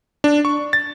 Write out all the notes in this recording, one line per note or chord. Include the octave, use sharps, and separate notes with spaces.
D4
C#6
A6